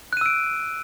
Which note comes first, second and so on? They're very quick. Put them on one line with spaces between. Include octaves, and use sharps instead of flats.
F#6 D#7 E6 D7